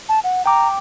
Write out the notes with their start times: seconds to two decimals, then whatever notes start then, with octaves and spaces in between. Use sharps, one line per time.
0.09 A5
0.24 F#5
0.46 G5 A#5 D6